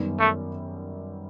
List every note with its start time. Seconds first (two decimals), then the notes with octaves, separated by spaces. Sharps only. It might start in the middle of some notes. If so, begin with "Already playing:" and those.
Already playing: F#2 D#3 G3 B3
0.20 A3